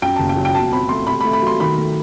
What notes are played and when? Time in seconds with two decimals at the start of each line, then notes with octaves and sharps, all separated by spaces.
0.02 F#2 G5
0.16 F#1 A5
0.29 G5
0.37 F#3
0.45 G5
0.55 B2 A5
0.72 C4 B5
0.89 A3 C6
1.07 C3 B5
1.21 B5
1.25 A3
1.33 B5
1.42 F#3 C6
1.60 D#3 B5
1.77 A3